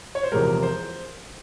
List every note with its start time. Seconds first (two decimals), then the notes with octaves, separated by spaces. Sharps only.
0.15 C#5
0.23 C5
0.32 E2 C3 F3 G#3 A#4
0.62 C5